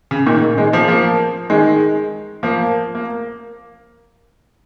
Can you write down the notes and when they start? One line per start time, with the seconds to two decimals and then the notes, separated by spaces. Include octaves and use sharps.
0.11 C#3
0.26 A#2 D#3
0.57 D#3 G#3
0.73 F3 A#3
0.88 F3 A#3
1.50 D#3 G#3
2.43 F3 A#3
2.95 A#3